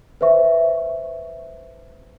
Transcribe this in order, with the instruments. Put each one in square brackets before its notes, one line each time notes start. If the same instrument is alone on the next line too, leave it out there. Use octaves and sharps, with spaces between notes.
[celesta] B4 C5 E5 C#6